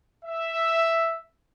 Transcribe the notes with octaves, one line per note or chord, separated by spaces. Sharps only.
E5